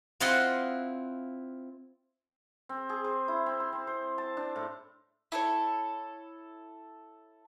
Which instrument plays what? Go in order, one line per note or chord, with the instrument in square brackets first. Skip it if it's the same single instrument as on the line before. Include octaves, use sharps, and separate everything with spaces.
[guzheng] C4 E4 F4 D#5 F#5 C6
[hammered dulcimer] C4
G#4
C5
E4
C4
C6
C4
C5
A5
D4
A2
[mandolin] E4 A4 C#5